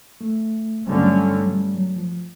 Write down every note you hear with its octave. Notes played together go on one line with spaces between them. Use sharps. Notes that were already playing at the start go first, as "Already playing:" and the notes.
A3
G2 D3 F#3 G3 A3 C#4
F#3
G3
F#3
F3